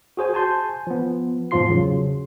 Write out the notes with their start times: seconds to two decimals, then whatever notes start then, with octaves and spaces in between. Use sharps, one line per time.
0.17 F#4 G#4 C5 G#5
0.34 G#5 A5 C6 G6
0.87 F3 B3
1.51 E2 G#2 F3 F4 C6 C7
1.70 C#3 F#3